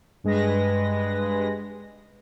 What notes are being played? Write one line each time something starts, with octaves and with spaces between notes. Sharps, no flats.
G2 G#3 B4 A#6